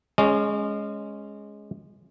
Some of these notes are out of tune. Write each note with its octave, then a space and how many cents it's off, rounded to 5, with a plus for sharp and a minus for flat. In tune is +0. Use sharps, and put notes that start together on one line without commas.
G#3 +5 C#4 +0 D#5 -40